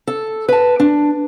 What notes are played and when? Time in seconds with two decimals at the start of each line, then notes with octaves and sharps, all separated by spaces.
0.07 A4
0.48 B4 A5
0.80 D4